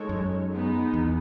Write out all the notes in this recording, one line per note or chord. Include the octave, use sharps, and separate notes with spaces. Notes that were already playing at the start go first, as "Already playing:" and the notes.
Already playing: G#3 D#4 A4 C#5
F#2
G#3 B3 D#4
E2